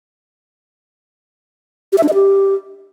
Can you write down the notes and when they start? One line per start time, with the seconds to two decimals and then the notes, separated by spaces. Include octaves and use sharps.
1.92 G4
1.98 E5
2.03 D4
2.08 D#5
2.14 G4